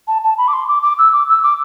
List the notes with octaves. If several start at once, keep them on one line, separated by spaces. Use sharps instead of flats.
A5
A5
B5
D6
C6
D6
D6
E6
D6
E6
D6